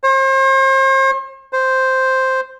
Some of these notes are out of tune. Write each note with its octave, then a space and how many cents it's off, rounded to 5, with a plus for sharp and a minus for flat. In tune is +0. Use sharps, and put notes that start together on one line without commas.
C5 +40
C5 +0